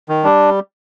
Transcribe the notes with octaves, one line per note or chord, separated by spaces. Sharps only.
D#3
G3 D4